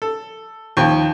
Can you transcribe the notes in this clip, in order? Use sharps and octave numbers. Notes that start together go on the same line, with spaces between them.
A4
D#2 F3 G5